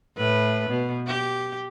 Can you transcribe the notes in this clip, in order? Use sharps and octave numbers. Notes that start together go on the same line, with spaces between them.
A2 B4
B2
G4